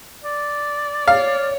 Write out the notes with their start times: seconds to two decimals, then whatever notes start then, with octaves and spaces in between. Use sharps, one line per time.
0.24 D5
1.08 C#5 F5